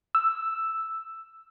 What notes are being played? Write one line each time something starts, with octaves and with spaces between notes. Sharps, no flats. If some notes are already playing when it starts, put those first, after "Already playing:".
E6